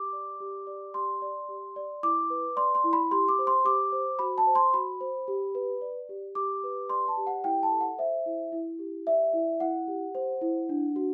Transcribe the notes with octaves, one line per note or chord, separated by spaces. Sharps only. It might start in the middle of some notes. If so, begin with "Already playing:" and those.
Already playing: G4 D6
D5
G4
D5
G4 C6
D5
G4
D5
E4 D6
B4
D5 C6
C6
E4
B5
G4 C6
D6
C5
C6
G4 D6
C5
F#4 B5
A5
C5
C6
F#4 B5
C5
G4
B4
D5
G4
G4 D6
B4
D5 C6
A5
G4
F#5
E4 G5
A5
A4
F#5
C5 E5
E4
E4
G4
D5 E5
E4
E4 F#5
G4
C5
E4
D4
F#4